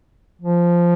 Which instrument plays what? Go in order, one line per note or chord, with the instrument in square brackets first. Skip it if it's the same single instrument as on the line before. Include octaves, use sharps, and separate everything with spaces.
[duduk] F3